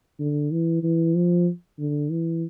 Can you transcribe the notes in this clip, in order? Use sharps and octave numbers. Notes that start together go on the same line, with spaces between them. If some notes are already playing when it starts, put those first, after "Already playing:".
D3
E3
E3
F3
D3
E3